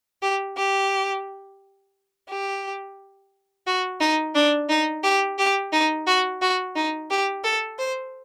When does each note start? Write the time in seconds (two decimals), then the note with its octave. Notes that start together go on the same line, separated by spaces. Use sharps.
0.22 G4
0.57 G4
2.29 G4
3.67 F#4
4.00 D#4
4.35 D4
4.69 D#4
5.04 G4
5.39 G4
5.72 D#4
6.07 F#4
6.42 F#4
6.75 D#4
7.10 G4
7.44 A4
7.79 C5